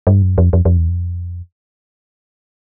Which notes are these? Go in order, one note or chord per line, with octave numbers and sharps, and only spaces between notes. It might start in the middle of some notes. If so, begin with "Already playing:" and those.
G2
F#2
F2
F2
F2
E2
F2